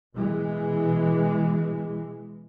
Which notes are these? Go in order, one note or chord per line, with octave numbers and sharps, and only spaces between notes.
B2 E3 G#3